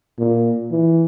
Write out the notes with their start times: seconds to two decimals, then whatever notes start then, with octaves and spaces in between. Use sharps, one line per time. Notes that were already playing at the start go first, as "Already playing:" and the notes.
0.19 A#2
0.71 E3